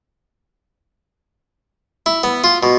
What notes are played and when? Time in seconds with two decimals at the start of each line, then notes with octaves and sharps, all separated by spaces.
2.06 E4
2.23 B3
2.44 F4
2.63 B2